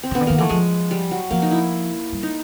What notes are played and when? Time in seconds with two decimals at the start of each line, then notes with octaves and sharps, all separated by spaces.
0.03 C4
0.11 C#3 B3
0.21 D3
0.27 D#3 A#3
0.38 E3 A3
0.49 F3 G#3
0.91 G3
1.11 F#3
1.31 F3 A#3
1.42 D#4
1.51 E4
2.12 G3
2.23 D#4